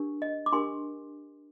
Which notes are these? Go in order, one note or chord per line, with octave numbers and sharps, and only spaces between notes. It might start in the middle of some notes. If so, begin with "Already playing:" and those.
Already playing: D4 G4 A#4
D#5
D6
D4 G4 A#4 G#5 C6